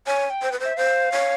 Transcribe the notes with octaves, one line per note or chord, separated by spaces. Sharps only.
C#5 G#5
G5
C5
B4
C5
E5
C5 F5
C#5